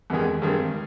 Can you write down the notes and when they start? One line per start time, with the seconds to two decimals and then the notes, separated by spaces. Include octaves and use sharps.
0.10 E2 C3 D#3 G#3
0.42 G2 D#3 G#3 C4